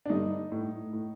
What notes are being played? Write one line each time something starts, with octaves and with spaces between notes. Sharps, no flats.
D4
G2 D3 D#4
A2
A2